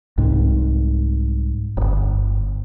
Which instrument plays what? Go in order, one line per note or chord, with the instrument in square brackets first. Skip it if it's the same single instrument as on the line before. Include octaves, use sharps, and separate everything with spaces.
[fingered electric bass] C2 G#2
D1 G1